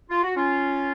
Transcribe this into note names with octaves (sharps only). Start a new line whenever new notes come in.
F4
F#4
C#4 F4